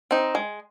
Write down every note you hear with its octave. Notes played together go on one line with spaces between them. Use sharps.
C4 D#4
G#3